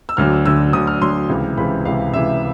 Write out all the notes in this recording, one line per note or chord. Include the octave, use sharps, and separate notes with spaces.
E6
D2 D3 F#3 F6
D2 D3 F#3 E6
D2 D3 F#3 D#6
F6
D2 D3 F#3 C6
C#2 C3 E3
C#2 C3 E3 B5
C#2 C3 E3 F5
C#2 C3 E3 E5